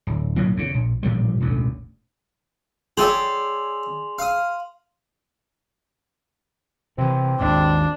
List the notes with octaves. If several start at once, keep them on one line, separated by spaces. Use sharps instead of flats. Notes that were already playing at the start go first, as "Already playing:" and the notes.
D1
B1 A2 F#3 A#3
E2 C#3
A#1
A1 A#2 F3 G3
E1 A1 D2
G#4 C#5 D5 E5 G5 C6 F7 F#7
F5 D#6
C3 E3 C4
G#1 D#2 G#2 D4